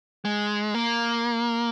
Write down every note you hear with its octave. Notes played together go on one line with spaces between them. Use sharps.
G#3
A#3